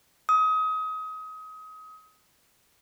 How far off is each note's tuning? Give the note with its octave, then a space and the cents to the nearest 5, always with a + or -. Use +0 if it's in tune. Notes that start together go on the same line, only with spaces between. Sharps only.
D#6 +30